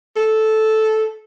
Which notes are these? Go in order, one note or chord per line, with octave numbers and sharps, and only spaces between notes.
A4